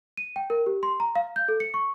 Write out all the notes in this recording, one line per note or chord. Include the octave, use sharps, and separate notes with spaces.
D#7
G5
A#4
G4
C6
A#5
F5
G6
A4
C#7
C#6